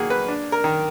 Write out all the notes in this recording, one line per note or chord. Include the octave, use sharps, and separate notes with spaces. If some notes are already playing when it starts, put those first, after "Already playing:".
Already playing: D#3 A#3 F#4 G#4
B4
D4
A#4
D#3